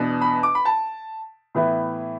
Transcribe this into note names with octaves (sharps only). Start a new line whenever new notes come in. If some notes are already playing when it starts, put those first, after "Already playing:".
Already playing: E2 B2 B3 D4
B5
D6
B5
A5
A2 E3 B3 E4